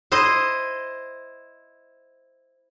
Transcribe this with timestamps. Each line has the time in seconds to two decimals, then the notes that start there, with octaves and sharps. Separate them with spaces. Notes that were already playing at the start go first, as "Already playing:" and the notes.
0.12 E4 C5 D#5